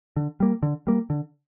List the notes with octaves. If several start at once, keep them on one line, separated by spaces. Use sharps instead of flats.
D3
G3 A#3
D3
G3 A#3
D3